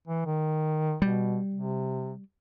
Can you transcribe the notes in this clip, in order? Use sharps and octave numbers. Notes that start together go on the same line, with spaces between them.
E3
D#3
B2 G3
C3